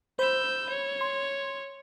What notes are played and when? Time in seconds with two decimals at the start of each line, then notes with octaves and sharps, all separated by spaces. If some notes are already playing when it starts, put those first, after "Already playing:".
0.19 C5 B5 E6 G6
0.69 C#5
1.01 C6